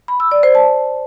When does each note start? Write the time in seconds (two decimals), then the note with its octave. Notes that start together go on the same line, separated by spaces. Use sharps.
0.08 B5
0.20 E6
0.32 D5
0.43 C5
0.55 A5